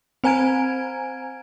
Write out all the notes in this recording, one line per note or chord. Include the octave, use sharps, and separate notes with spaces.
C4 C5 G#5 A#5 G#6 D7